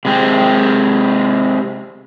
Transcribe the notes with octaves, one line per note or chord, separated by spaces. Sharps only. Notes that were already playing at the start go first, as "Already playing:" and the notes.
C3 G#3 C4